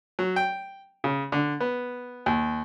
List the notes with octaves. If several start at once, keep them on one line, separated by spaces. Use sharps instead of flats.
F#3
G5
C#3
D3
B3
D#2